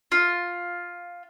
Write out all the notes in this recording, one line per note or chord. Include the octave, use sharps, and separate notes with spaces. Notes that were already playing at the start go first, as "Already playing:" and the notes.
F4